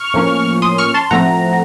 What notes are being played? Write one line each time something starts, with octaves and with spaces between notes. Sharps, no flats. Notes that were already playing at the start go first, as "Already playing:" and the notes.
Already playing: C#6 F6
A2 F3 A#3 C#4
C6 D#6
C#6 F6
A5 C6
A2 F3 A3 C4 F#5 A#5